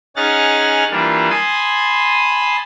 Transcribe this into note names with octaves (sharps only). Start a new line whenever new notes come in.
C#4 D#4 G#4 F#5 F6 A6
E3 G3 A#3 D4 F4
G#5 A5 B5 C6 D#6